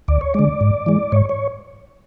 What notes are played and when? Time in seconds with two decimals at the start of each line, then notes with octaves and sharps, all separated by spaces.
0.08 D2 D5
0.21 C#5
0.34 D3 G#3 D5
0.61 G#2
0.86 E3 G#3
1.12 G#2 C#5
1.29 C#5